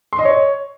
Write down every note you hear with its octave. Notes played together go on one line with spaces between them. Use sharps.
C6
D#5
C#5